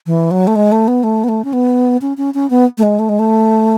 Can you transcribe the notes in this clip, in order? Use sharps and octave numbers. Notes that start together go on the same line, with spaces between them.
E3
F#3
A3
G#3
A3
B3
A3
B3
A3
C#4
B3
C#4
C#4
C#4
B3
A3
G#3
A3
G#3
A3